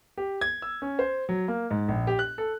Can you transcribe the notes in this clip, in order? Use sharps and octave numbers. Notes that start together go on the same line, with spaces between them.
G4
G#6
E6
C#4
C5
F#3
A#3
G#2
A#1
G4
F#6
A4